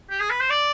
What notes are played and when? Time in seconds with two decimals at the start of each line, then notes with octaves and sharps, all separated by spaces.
0.10 G4
0.20 G#4
0.30 B4
0.41 C5
0.50 D5